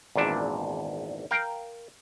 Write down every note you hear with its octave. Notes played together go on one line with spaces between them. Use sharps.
G#1 E2 A#2 D4 E5
A#4 F5 G5